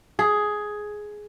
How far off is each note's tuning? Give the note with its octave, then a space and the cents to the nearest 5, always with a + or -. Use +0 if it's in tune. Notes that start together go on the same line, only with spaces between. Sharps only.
G#4 +10